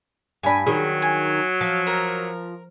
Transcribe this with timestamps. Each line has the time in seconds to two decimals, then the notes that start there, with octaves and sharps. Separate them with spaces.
0.43 G2 D4 G#5 B5
0.67 D#3 F#3 G#4
1.02 G#5
1.61 F3 F5
1.87 A#4